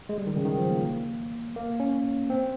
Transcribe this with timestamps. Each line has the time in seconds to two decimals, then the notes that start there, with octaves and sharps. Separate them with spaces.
0.09 G#3
0.18 G3
0.27 D#3
0.37 C#3
0.45 D#3
0.58 F3
0.71 A#3
1.56 A#3
1.80 C#4
2.30 C4